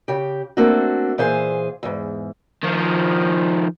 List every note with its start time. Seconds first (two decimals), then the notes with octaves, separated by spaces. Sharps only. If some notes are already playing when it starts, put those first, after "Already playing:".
0.08 C#3 G4
0.57 A3 A#3 C4 D4 F#4
1.18 A#2 E3 G#4 C5 F5 G#5
1.83 E2 G#2
2.63 D#3 F3